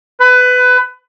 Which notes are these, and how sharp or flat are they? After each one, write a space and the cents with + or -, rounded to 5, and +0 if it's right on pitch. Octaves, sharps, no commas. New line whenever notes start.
B4 +20